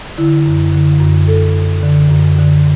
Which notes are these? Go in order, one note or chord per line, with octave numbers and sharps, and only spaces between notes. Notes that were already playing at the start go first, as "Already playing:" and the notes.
D3 E4
F#2
D3
F#2
D3 A4
F#2
D3
F#2
D3